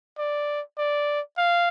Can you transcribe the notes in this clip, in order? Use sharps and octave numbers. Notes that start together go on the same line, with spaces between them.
D5
D5
F5